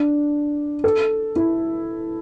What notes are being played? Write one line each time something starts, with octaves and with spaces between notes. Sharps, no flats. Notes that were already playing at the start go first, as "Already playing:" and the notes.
Already playing: D4
A4
E4